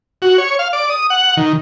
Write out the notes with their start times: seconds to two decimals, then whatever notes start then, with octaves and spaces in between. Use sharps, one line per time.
0.22 F#4
0.38 C#5
0.59 F5
0.73 D5
0.90 D#6
1.10 F#5
1.37 D#3